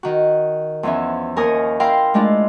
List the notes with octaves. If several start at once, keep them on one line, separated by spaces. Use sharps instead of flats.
D#3 F#4
E2 F3 B3 C#4 E5
D#2 A#4 G#5 C#6 D#6
E4 A#4 F5 G5 C6
G#3 A3 D4 E4 F4